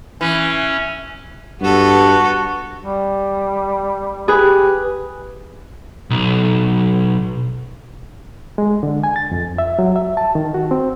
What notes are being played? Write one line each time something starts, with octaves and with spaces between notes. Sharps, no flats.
E3 C#4
G2 B3 F#4 A4
G3
G4 G#4 B4
B1
G#3
D3
G#5
A6
F2
E5
F#3
E5
A5
D#3
F#4
C4